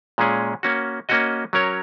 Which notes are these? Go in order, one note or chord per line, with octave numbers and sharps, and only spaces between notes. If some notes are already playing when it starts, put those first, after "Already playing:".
A#2 G#3 C#4 G#4
A#3 C#4 F#4
A#3 C#4 F#4 D#5
F#3 C#4 A#4 C#5